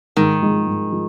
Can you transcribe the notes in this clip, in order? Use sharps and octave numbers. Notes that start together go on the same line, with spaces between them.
G#2 D#3
F3 G#3 D#4
G#2
F3